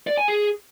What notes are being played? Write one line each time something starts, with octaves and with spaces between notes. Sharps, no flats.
D5
G#5
G#4